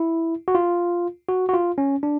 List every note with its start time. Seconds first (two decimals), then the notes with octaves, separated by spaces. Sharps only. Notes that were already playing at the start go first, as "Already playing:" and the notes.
Already playing: E4
0.48 F#4
0.55 F4
1.29 F#4
1.49 F#4
1.53 F4
1.78 C#4
2.03 D4